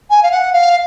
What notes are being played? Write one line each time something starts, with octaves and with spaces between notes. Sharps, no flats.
G#5
F5
F#5
F5